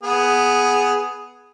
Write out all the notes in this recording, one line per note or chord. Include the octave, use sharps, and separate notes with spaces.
B3 G#4